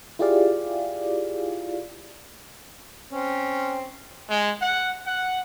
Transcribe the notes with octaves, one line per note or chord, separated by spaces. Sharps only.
E4 F4 G4 G#4 D5 F5
C4 C#4
G#3
F#5
F#5